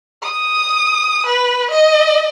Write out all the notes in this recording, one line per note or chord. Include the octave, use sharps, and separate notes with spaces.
D#6
B4
D#5